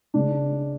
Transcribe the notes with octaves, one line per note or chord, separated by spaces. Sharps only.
C#2 C#3 G#3 D4